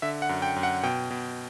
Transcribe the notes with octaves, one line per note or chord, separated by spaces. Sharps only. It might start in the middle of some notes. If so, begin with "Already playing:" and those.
D3 E5
F#5
F#2
G5
F#2
F#5
B2 G5
B2